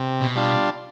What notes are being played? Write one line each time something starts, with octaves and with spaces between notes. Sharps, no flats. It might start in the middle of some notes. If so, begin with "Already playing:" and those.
Already playing: C3
B2
G3 D4 F4